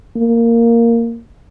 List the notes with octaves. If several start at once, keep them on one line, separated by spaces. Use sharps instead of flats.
A#3